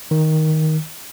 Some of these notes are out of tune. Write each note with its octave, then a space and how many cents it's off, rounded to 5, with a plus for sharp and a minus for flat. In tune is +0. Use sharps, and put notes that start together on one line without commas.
D#3 +10